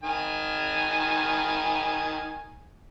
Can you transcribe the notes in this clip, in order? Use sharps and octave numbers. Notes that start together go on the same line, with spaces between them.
D#3 G#5